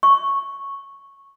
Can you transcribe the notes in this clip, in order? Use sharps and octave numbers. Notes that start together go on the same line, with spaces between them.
C#6